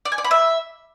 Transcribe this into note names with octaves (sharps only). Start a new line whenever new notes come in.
D5
G#5
D5
B5
E5